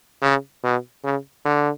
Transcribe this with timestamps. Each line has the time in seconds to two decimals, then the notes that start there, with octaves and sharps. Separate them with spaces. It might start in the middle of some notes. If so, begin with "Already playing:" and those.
0.22 C#3
0.64 B2
1.04 C#3
1.45 D3